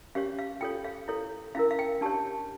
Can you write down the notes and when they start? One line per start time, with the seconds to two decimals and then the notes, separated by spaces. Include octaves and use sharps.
0.15 C#4 G4 C#5 F5
0.39 F5
0.61 F4 A4 C#5 G5
0.84 F5
1.08 E4 A4 C#5
1.55 C#4 E4 A#4 F5
1.71 F5
1.79 G5
2.01 D4 G4 C#5 A5